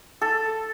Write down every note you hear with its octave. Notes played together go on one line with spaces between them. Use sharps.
A4